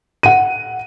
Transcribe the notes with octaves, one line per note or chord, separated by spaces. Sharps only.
F#5 D#7